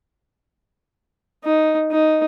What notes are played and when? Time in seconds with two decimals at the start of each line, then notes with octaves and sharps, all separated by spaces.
1.44 D#4
1.91 D#4